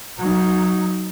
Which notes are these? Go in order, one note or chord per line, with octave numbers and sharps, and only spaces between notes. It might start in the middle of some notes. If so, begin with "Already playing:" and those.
F#3 D#4